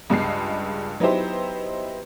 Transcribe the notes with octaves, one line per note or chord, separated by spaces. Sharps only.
C#2 G2 G#3 C7
F#3 B3 D#4 E4 G4 C5